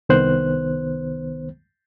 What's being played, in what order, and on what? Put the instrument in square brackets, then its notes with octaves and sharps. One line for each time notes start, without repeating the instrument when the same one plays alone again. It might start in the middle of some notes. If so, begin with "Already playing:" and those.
[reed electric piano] C2 D#3 B3 C5 F#6